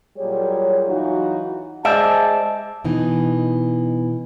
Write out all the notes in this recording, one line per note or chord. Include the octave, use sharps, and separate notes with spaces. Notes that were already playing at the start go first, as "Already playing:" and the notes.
A#2 F#3 G3 G#4 C#5
E3 F#3 D#4 F4 F#4
G#3 C5 D5 E5 A5
B2 E3 D#4